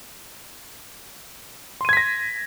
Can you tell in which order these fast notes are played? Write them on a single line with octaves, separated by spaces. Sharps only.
C6 D#7 G#6 B6 A#6